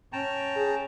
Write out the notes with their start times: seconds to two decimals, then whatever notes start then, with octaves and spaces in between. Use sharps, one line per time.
0.13 C#4 G5 A5 A#5
0.56 G#4